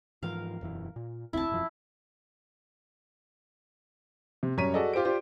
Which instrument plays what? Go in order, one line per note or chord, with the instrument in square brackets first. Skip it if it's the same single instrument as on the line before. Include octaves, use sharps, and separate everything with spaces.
[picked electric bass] G#2 E3 F3 [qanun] A#4 F5
[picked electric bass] E1 F#2 E3
A#2
[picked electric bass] F1 D2 C4 [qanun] E4 A5
[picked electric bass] E1 F#2 F3
[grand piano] C3
F#2 G3 C#5 A#5 B6 D#7
F#4 G#4 A4 D5 D#5
F4 G4 C5 D7
F4 G4 C5 D5